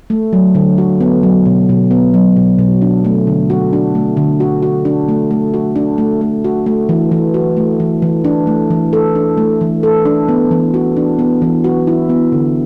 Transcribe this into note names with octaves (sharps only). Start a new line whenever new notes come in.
A3
F#3
D3
F#4
B3
F#3
B2
B2
B3
F#3
B2
B2
D4
A3
D3
F#4
D4
A3
D3
F#4
F#4
D4
A3
A3
F#4
D4
A3
A3
F#4
A3
E3
E3
F#4
A3
E3
E3
D4
A3
E3
A4
D4
A3
E3
A4
D4
B3
E3
F#4
D4
B3
E3
F#4
E4
B3
D3